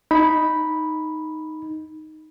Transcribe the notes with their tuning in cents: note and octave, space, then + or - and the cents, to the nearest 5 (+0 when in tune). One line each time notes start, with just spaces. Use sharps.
D#4 +0 B5 -5